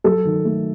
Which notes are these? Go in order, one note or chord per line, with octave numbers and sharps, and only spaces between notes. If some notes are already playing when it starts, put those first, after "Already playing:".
F#3 A4
D#3
A3